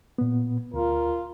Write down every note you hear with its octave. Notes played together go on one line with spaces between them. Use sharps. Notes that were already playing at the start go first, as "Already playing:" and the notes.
A#2 B3
D2 F4 A#4